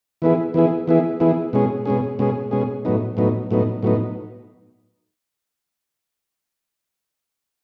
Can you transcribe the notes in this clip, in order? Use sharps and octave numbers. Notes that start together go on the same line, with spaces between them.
E3 B3 E4 G#4
E3 B3 E4 G#4
E3 B3 E4 G#4
E3 B3 E4 G#4
B2 G#3 C#4 G#4
B2 G#3 C#4 G#4
B2 G#3 C#4 G#4
B2 G#3 C#4 G#4
A2 F#3 B3 D#4
A2 F#3 B3 D#4
A2 F#3 B3 D#4
A2 F#3 B3 D#4